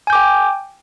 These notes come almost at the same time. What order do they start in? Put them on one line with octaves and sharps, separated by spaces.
G#5 G6 D6 G5